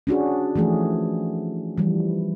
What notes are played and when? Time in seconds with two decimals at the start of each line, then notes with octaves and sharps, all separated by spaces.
0.07 C#4 D4 F#4 G#4
0.56 E3 F3 A3 G#4
1.78 E3 F3 G3